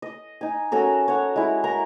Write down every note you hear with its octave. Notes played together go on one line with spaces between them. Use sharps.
D#5
D#4 G#5
C#4 F#4 A4 A#4
C#5 F#5
G#3 E4
A#4 A#5